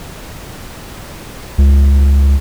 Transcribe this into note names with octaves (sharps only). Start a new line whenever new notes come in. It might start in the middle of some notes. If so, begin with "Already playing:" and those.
C#2